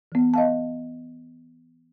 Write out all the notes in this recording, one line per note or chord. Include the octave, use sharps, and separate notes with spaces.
E3 B3
D#5 F5 A5